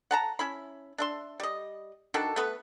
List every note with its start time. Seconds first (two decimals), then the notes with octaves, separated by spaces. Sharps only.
0.11 F#5 A5 A#5
0.39 C#4 E4 B5
0.98 D4 E5 C6
1.40 G3 D#5
2.14 D#3 D4 F#4 A4
2.36 A3 B3 B4